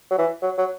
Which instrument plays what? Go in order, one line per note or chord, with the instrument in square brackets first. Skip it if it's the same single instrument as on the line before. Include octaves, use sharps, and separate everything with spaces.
[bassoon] F#3
E3
F#3
F#3